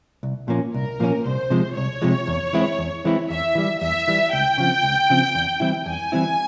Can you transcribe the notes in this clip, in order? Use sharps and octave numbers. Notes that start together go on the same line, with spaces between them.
C2
A#2 F3 A#3 C#4
C2 A#4
A#2 F3 A#3 C#4
C2 C5
C3 F3 G#3
C2 C#5
C3 F3 G#3
E2
E3 G#3 C4 E4
E2
E3 G#3 C4 E4
E2 E5
E3 G3
E2 E5
E3 G3
C#2 G5
C#3 F3 C4
C#2
C#3 F3 C4
E2
E3 G3 C4 E4
E2 G#5
E3 G3 C4 E4